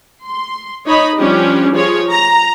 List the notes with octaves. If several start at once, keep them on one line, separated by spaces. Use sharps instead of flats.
C6
D#4 C#5 D#5 B5
F3 G3 C#4 D4 G4
F3 F4 G#4 C#5
A#5